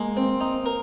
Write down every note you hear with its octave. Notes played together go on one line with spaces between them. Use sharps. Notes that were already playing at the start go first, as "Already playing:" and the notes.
Already playing: G#3 A#3
C4
D#4
A#4